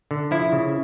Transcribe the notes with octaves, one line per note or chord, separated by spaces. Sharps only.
D3
F3 E4
C#3